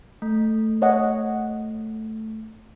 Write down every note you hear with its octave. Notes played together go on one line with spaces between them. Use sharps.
A3
C#5 D#5 F#5